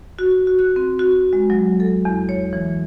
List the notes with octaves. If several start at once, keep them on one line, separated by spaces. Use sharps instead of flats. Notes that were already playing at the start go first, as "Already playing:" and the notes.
F#4
F#4
F#6
C4
F#4
G#3
F#3
A4
E2
C#5
E3